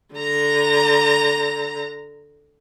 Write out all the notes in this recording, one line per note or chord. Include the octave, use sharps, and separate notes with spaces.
D3 A#5